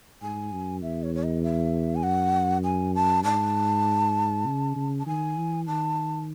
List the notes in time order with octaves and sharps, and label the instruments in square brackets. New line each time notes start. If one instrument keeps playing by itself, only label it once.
[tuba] G#2 [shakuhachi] G#5
[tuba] F#2
[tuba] E2 [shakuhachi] E5
[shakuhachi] C#5
C#5
D#5
E5
G#5
[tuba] F#2 [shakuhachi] F#5
[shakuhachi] G#5
A5
[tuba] G#2 [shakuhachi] A5
[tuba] C#3
C#3
[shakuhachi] A5
[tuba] D#3 [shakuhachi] G#5
[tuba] E3
[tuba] D#3 [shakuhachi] A5